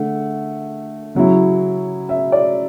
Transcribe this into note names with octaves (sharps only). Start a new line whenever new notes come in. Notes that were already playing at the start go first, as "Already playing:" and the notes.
Already playing: D3 A3 F#5
C#3 F#3 C#4 E4
E5
D5